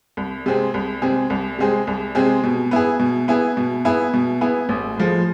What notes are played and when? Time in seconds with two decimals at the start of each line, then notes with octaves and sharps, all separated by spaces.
0.17 C2
0.46 C3 G#3 C4 G#4
0.74 C2
1.02 C3 G#3 C4 G#4
1.30 C2
1.59 C3 G#3 C4 G#4
1.87 C2
2.15 C3 G#3 C4 G#4
2.44 B2
2.71 B3 E4 G#4
2.99 B2
3.28 B3 E4 G#4
3.57 B2
3.85 B3 E4 G#4
4.13 B2
4.41 B3 E4 G#4
4.69 A1
4.97 A2 F3 G#3